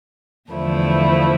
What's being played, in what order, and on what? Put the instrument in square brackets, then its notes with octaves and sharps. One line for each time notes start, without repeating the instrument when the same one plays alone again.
[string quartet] E2 D3 F3 A3 E4